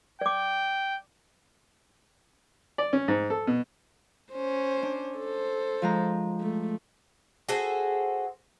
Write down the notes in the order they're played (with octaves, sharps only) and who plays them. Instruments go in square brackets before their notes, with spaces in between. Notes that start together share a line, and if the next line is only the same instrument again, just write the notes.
[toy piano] D5 D6 [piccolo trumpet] G5
[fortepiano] D5
C#4
G#2
A4
B2
[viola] C#4 C5
[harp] D4
[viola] A4 C5
[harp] F3 G#3 A#5
[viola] A3
[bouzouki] F#4 G#4 A4 C5